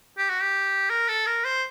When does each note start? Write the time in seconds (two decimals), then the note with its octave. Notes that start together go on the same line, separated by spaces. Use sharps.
0.18 G4
0.29 F#4
0.42 G4
0.90 A#4
1.08 A4
1.27 A#4
1.45 C5